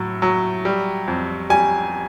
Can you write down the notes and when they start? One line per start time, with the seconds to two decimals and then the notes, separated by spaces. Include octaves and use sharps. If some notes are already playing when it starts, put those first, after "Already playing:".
Already playing: A2 F#3
0.22 F#3
0.65 G3
1.08 F2
1.50 G3 G#5